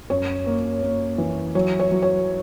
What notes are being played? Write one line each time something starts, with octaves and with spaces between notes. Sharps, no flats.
F#2 C#5
A#3
A#3
E3
F#3 C#5
C#5
F#3
C#5